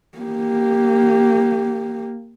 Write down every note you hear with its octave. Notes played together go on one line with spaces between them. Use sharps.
A#3 G4